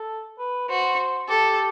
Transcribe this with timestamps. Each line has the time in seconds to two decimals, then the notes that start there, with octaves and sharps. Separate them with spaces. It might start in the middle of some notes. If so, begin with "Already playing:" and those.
Already playing: A4
0.39 B4
0.69 F#4 C5
1.29 G4 A4